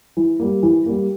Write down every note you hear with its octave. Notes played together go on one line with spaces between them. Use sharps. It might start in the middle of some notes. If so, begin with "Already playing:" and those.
E3
G3 A#3
E3
G3 A#3